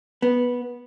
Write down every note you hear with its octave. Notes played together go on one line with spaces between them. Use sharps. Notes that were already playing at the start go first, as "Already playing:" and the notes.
B3